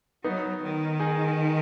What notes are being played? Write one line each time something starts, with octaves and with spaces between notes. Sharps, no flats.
F#3 B3 D#4
D#3
D#4 G#4